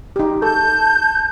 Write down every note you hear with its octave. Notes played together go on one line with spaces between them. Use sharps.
D#4 G4
A4 A5 G6